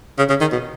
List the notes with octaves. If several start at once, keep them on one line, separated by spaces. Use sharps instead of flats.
C#3
C#3
D#3
B2